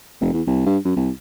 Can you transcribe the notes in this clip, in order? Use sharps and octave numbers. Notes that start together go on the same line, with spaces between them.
F1
E2
C2
G2
F#2
C2